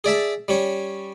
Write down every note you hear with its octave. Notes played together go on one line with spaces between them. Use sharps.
G#4 D5 E5 A5
G3 C#4 C#5